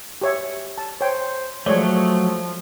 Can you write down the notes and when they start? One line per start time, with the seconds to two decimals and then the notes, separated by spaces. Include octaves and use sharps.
0.21 G4 C#5 E5
0.78 A5
1.01 C5 C#5 G5
1.66 F3 F#3 G#3 A3 C#5 D5